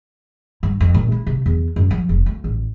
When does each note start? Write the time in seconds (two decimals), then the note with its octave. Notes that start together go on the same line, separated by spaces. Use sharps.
0.63 G2
0.80 F2
0.94 A#2
1.12 E4
1.27 C3
1.46 E2
1.76 F#2
1.91 F3
2.09 F1
2.26 D2
2.44 A1